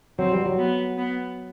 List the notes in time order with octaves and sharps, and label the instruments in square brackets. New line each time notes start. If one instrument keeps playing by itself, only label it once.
[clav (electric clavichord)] F#3 [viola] C4
[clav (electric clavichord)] G3
F#3
[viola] B3
B3